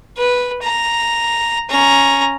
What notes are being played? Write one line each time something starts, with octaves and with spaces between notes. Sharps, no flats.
B4
A#5
C#4 A#5